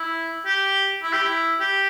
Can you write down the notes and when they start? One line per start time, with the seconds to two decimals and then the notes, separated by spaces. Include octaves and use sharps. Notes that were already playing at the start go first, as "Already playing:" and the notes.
Already playing: E4
0.46 G4
1.03 E4
1.13 G4
1.23 E4
1.60 G4